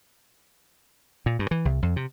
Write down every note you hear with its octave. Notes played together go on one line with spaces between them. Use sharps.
A#2
G2
E3
C2
F2
C3